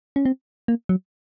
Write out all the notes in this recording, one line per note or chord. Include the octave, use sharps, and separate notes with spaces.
C#4
C4
A#3
F#3